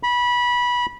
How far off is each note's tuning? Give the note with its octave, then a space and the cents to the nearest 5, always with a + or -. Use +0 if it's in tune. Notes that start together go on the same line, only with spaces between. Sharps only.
B5 -20